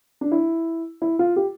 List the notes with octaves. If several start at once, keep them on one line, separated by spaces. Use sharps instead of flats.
D4
E4
E4
F4
G4